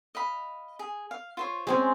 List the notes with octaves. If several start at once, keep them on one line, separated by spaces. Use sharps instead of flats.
D#5 F5 B5
G#4
F5
F4 C5 C#5
G#3 C4 C#4 G#4